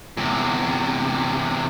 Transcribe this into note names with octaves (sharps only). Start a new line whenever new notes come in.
E2 C3